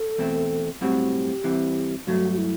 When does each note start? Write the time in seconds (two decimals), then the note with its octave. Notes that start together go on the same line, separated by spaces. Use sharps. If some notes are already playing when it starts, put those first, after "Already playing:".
Already playing: A4
0.18 E2 B2 A3 C4
0.81 B1 A2 G3 C4 F#4 G4
1.44 C2 C3 E3
2.07 G2 F#3 A3 F#4
2.32 F#4
2.38 E4